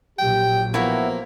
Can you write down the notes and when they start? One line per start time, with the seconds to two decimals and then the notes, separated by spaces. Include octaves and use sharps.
0.18 A#1 A#2 F#3 G4 G5
0.74 F3 A#3 B3 E4 F#4 E5